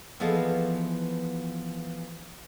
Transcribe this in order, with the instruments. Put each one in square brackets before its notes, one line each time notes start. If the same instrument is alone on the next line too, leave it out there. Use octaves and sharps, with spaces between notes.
[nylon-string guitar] E3 F3 B3 G#4 A4 D#5